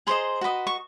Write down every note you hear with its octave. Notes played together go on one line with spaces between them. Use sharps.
G#4 C5 D#5 A#5 C6
F#4 B4 D#5
C#6